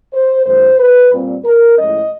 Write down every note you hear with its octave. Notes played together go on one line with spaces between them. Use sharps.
C5
F#2 D#3 G#3 C5
B4
A#2 G3 C4
A#4
A2 F3 G#3 C#4 D#5